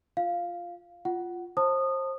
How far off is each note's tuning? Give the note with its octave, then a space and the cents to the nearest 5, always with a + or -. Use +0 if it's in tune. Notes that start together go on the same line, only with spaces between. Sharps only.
F4 +0 F5 +0
F4 +0 F#5 +10
C5 +30 A5 +25 D#6 -20